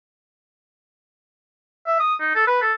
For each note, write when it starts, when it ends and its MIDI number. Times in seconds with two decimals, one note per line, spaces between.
1.86 1.98 76
2.00 2.15 87
2.21 2.32 63
2.35 2.45 69
2.47 2.60 71
2.62 2.73 69